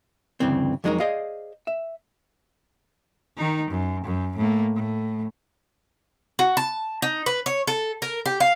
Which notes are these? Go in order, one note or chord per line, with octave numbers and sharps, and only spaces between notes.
D2 G2 C#3 E3 C4
F2 F#3 G#3 D#4 E4 A#4
G#4 C5 D5 D#5 F5
E5
D#3 D#4
F#2
F#2
A2 A#3
A2
F#4
A5
D#4
B4
C#5
A4
A#4
G4
F5